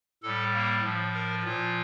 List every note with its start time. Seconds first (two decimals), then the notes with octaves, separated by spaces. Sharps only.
0.23 A2 G3 A4
0.54 A#3
0.83 A2 F3
1.14 A#4
1.44 A#2 F3 F4